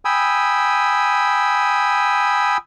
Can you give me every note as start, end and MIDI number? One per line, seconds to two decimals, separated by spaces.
0.05 2.57 79
0.05 2.57 80
0.05 2.57 83
0.05 2.57 87
0.05 2.57 88